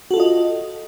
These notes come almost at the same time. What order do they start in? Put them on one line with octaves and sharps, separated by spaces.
F#4 A4 F4 D#5